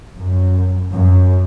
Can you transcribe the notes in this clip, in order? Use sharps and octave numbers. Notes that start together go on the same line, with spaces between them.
F#2
F#2